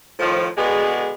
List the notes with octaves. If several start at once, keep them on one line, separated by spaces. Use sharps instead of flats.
A2 D#3 F3
B2 D3 G#3 B3 G#4